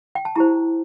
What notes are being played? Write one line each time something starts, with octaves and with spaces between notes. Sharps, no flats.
G5
A5
E4 G4 C5 A#5